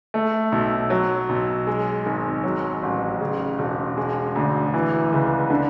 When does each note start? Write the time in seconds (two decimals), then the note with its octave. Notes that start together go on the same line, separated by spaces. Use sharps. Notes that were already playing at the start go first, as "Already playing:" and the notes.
0.14 A3
0.52 B1
0.90 F#3
1.29 B1
1.67 G#3
2.06 G#1
2.44 F#3
2.83 A1
3.20 C#3
3.59 E1
3.97 G#3
4.35 D2
4.74 E3
5.12 C#2
5.50 D3